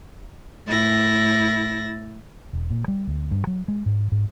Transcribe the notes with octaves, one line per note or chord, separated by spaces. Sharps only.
A2 E4 A6 A#6
E1
A#2
G3
D2
G2
F#3
G#3
G#2
G#2